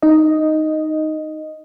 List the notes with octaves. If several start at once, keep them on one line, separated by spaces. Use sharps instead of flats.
D#4 D#5